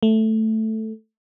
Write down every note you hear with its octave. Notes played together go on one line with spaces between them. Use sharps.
A3